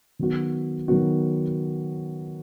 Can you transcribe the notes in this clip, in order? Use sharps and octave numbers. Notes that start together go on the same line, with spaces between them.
D#3 F#3 B3 F#4
D#3 F#3 B3 F#4